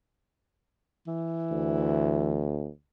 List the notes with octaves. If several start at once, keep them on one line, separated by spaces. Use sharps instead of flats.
E3
D2